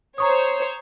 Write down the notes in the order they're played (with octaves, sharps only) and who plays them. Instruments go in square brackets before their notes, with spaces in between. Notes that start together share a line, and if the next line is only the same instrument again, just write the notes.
[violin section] C5 C#5 [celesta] A#5 C#6 D#6